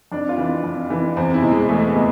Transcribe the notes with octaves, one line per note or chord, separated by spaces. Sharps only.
F2 D4
F4
E3
F2
E3
E2 C4
E4
B2
G#3
E2 A3
B3
B2